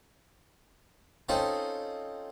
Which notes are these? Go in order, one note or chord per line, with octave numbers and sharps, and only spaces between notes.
C4 C#4 D#4 F4 A4